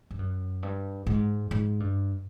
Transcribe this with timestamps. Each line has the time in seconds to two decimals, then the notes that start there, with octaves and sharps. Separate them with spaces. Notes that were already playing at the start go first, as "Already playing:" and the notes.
0.11 G2
0.19 F#2
0.63 G2
1.07 G#2
1.51 G#2
1.80 G2